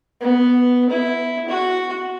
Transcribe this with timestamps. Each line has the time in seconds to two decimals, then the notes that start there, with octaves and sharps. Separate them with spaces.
0.21 B3
0.90 E4
1.49 F#4